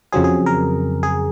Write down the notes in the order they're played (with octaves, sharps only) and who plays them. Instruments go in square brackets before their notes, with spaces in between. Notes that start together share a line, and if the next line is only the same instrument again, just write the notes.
[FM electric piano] F2 C#3 F#3 C4 G#4
G#4
A#4
G#4